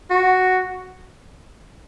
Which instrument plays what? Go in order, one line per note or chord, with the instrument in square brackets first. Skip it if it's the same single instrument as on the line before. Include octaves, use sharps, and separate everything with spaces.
[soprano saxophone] F#4